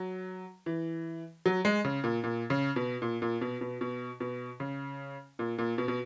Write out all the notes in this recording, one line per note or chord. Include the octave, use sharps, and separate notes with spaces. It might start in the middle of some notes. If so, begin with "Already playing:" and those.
Already playing: F#3
E3
F#3
G#3
C#3
A#2
A#2
C#3
B2
A#2
A#2
B2
B2
B2
B2
C#3
A#2
A#2
B2
B2